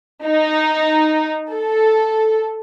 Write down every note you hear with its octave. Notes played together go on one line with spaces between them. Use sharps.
D#4
A4